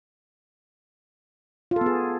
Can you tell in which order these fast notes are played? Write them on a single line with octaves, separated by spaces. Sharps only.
F4 A4 B3 G#4